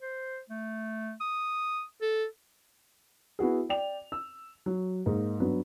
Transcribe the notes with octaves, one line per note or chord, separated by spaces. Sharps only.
C5
A3
D#6
A4
B3 E4 F#4 G#4
D5 G5 F7
E6
F#3
G#2 A#3 D#4
G2 F#3 B3